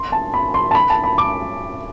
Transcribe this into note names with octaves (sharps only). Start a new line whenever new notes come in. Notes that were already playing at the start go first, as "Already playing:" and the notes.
Already playing: C6
A5
B5
C6
A5
B5
A5
B5
D6